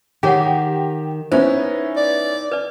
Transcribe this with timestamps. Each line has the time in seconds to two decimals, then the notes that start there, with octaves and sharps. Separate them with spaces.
0.23 D#3 G4 G#4 C#5 F#5
1.32 B3 C#4 D#4 E4 C5
1.97 D5
2.52 B4 D5